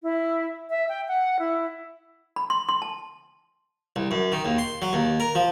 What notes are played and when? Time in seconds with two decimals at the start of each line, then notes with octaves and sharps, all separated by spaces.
0.03 E4
0.70 E5
0.89 G5
1.08 F#5
1.39 E4
2.36 B5
2.50 C6
2.69 C6
2.82 A5
3.96 C2
4.11 F#2
4.32 D#3
4.45 D#2
4.58 C6
4.82 F#3
4.93 D#2
5.20 A#4
5.35 F3